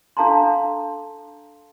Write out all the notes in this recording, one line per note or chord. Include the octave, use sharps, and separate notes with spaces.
D4 A4 F5 A5 A#5 C6